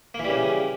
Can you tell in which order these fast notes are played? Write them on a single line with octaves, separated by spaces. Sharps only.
A#3 E3 G3 C#3